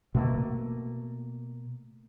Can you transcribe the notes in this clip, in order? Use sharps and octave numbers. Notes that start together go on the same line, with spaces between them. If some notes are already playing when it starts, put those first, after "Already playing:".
B2 A3 A#3